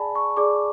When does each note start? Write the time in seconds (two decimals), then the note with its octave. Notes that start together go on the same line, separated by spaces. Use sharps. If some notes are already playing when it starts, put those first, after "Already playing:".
Already playing: G#4 D5 G#5 A5 B5
0.15 C#6
0.37 G#4 D5 D6